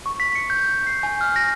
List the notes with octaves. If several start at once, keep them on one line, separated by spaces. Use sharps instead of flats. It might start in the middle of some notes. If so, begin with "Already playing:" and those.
C#6
B6
C#7
G6
C7
G#5
F6
A#6